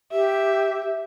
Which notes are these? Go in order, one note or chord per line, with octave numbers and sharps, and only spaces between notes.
G4 E5